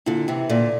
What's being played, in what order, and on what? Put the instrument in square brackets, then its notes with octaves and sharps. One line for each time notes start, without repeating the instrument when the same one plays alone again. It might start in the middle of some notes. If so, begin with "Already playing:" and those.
[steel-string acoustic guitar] A#2 D3 [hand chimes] E4
[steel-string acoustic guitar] C3 E3
[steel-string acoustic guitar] A#2 D3 [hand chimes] A4 D5